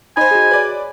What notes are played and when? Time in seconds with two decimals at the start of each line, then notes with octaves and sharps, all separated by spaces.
0.17 D#4 C5 G#5 B5
0.31 F#4 G#4
0.51 B4 C#5 D5